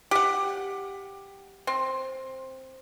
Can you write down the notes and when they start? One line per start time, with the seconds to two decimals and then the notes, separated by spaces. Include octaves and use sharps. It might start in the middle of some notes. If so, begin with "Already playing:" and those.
0.11 G4 F#5
1.67 C4